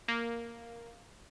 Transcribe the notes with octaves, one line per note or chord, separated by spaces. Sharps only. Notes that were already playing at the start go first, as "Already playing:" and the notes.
A#3